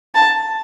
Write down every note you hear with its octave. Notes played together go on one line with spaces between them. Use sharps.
A5